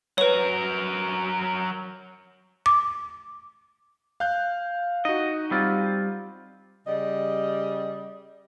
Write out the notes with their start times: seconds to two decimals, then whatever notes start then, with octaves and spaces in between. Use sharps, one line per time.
0.18 F#3 A#4 B4 C#5
2.66 D6
4.20 F5 F#6 G6
5.05 D#4 F#4 D#5
5.51 G3 C4 F4
6.88 C#3 G3 D#5